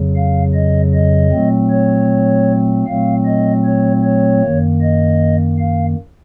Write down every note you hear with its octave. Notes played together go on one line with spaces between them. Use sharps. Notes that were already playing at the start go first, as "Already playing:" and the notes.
Already playing: F2 C#3 F#3
F5
D#5
D#5
A#2 F#3 A3 C4
C#5
A#2 F#3 A3 C4 F5
D#5
C#5
C#5
F#2 D#3 A#3
D#5
F5